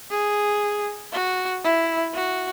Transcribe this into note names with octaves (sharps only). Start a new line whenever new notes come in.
G#4
F#4
E4
F#4